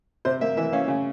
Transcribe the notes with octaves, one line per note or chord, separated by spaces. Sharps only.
C3 C5
A#3 E5
E3 E5
C#4 F5
C#3